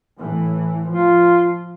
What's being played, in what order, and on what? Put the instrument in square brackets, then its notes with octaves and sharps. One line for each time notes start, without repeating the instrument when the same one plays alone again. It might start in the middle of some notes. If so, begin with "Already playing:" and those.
[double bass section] A2 E3
[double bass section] F3 [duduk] F4